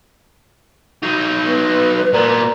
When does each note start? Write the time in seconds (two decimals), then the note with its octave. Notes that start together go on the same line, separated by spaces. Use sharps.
1.02 F#3 D#4
1.47 B3 B4
2.13 A#2 B3 A#4 D5 A#5